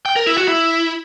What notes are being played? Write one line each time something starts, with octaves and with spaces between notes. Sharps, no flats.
G5
A#4
E4
F#4
E4